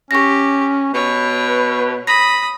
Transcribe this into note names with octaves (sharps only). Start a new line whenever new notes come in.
C#4 G4 C#6 A#6
B2 B4 C#5
B5 D#6 A#6